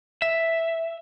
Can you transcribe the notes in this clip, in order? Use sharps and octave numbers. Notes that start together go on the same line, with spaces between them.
E5